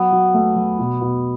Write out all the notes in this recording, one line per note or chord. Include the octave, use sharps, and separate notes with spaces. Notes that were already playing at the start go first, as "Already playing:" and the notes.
Already playing: F#3 B3
F#3
A3
F#3
B2
B2